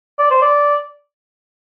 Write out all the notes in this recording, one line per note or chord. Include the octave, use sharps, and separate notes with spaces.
D5
C5
D5